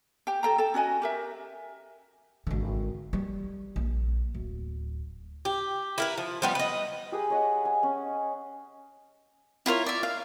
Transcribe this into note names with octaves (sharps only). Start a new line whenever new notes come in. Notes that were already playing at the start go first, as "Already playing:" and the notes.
G4 G5
A4 G5 A#5
A4 G5
C#4 F#4 D#5 G#5
G4 A#4 E5
G#1 D3
G3
A#1
D1
G4
E4 A#4 B4
F3
F3 G3 B3
B4 D#5
G4 G#4 B4
C#5 D#5 F#5
G#5
C#4
E4 F4 A#4 C#5
D5 E5
F5